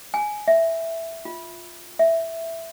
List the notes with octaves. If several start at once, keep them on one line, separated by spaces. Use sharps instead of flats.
G#5
E5
F4
E5